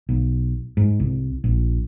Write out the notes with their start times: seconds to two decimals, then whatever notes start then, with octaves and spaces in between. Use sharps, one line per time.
0.09 B1
0.77 G#2
1.00 C2
1.44 A#1